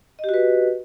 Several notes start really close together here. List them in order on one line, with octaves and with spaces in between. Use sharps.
D#5 G4 F#4 B4